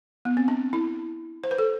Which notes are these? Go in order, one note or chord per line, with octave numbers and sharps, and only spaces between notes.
B3
C4
D4
E4
C5
B4
A4